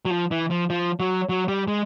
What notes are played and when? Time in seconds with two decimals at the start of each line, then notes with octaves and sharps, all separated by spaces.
0.05 F#3
0.10 F3
0.31 E3
0.50 F3
0.70 F3
1.00 F#3
1.29 F#3
1.48 G3
1.68 G#3